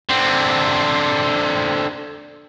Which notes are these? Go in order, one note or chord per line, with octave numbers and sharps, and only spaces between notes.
D3 C4